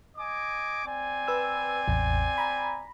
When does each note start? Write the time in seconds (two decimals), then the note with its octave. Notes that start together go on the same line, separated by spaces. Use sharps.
0.17 D#5 G#5 D6
0.86 C4 D5 G#5
1.28 B4 E6
1.88 A1 E2
2.38 A#5 B5